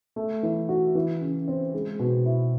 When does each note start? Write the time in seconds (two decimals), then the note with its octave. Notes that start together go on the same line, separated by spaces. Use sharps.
0.16 A3
0.43 E3
0.69 F#4
0.95 E3
1.21 C#3
1.48 C4
1.74 G#3
2.00 B2
2.25 E4